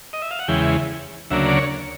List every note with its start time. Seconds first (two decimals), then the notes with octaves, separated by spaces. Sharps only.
0.13 D#5
0.22 E5
0.31 F5
0.39 F#5
0.48 E2 C#3 E3 G#3 G5
1.30 D2 C#3 F#3 A#3 D4 E5
1.48 D5
1.57 C#5